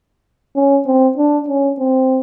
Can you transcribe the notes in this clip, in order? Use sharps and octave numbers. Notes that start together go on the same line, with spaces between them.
C#4
C4
D4
C#4
C4